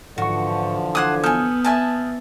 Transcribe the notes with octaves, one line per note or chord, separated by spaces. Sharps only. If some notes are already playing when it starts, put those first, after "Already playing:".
G#2 D3 E3 F3 F#4 C#6
C5 F#5 D6 D#6 G#6
B3 A4 G#5 D#6 F6 G6
E5 G#5 A5